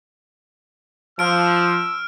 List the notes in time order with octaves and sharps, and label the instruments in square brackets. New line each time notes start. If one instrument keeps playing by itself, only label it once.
[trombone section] F3 [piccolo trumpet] E6 [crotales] F6 D7